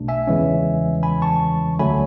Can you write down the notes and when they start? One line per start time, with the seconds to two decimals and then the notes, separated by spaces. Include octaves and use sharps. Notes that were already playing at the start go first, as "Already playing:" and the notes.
Already playing: B1 B2 A3 D4
0.08 E5 G#5
0.27 E2 C#3 E3 G#3 C#4
1.03 G#5 B5
1.22 A5 C#6
1.79 D2 D3 F#3 A3 G#5 B5